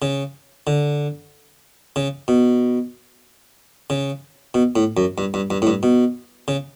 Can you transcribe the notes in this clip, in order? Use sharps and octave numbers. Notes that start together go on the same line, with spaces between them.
C#3
D3
C#3
B2
C#3
B2
A2
F#2
G2
G2
G2
A2
G2
B2
C#3